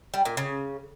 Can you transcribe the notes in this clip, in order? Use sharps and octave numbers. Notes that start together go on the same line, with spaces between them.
G3
A#2
C#3